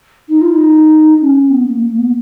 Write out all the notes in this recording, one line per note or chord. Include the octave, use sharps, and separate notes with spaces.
D#4
F4
D#4
C#4
C#4
B3
A#3
A#3
B3